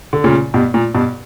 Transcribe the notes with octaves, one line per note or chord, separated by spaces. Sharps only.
D3
A#2 C#3
G2 B2
A#2
G2 B2